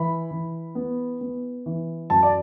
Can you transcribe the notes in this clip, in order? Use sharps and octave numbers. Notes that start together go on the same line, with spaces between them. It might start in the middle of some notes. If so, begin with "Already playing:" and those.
Already playing: E3 B5
E3
B3
B3
E3
F#2 A5
D5